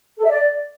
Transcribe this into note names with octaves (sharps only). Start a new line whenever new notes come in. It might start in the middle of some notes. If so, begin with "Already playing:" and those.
A4
E5
D5